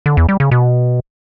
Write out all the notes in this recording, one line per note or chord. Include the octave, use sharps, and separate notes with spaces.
D3
E2
G3
C#3
B2